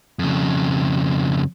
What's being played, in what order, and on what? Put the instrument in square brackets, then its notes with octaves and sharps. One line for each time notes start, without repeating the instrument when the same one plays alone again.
[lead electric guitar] F2 C#3